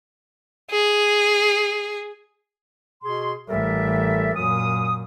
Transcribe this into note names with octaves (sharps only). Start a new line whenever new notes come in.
G#4
B2 G#4 C6
A1 G3 A4 A#4 E5
F#2 A#2 D#6